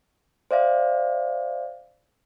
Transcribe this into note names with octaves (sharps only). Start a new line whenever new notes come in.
C5 D5 E5 F5